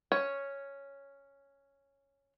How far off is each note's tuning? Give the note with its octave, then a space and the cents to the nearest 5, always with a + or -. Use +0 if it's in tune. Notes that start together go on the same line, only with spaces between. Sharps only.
C#4 +0 C#5 +0